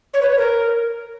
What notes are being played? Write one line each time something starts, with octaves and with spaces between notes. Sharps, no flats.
C#5
B4
C#5
A#4